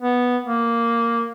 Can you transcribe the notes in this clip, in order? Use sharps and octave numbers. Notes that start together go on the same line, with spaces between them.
B3
A#3